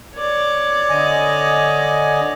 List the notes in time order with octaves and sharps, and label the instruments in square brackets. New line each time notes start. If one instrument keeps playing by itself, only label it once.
[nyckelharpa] C#5 D5
[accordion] D3 D#5 G#5